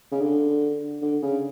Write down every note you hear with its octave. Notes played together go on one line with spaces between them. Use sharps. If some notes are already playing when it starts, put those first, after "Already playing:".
C#3
D3
D3
C#3